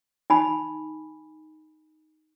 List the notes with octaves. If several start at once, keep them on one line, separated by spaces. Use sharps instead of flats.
D#4 G#5 B5